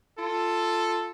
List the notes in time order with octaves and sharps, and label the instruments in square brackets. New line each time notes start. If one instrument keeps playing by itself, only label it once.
[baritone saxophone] F4 [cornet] A4